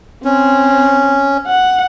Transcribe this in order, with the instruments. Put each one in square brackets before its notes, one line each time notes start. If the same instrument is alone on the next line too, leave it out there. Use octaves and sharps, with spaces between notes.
[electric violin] C4 [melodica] C#4
[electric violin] F#5